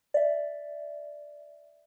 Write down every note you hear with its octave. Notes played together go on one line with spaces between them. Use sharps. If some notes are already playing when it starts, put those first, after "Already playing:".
D5 E5